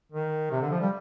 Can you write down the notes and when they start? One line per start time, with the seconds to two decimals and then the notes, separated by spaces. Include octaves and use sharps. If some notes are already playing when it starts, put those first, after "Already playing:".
0.12 D#3
0.51 C3
0.61 D3
0.71 F3
0.80 G3